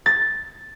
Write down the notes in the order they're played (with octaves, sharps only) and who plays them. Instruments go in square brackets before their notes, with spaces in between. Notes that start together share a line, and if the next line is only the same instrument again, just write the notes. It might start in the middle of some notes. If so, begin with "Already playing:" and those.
[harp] A6